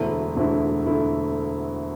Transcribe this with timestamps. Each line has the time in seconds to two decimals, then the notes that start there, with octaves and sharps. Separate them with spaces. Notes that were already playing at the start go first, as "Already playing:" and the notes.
Already playing: E1 D2 D3 A3 E4
0.37 E1 D2 D3 A3 E4
0.86 D3 A3 E4